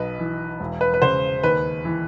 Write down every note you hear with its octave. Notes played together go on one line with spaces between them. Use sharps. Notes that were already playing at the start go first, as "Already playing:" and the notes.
Already playing: B1 B2 B4
E3
E1
B4
B4
C#3 C5
D#2 B4
E3